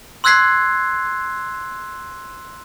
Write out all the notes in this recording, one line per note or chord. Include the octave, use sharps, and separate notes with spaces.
C6 E6 F#6 G#6 B6 C7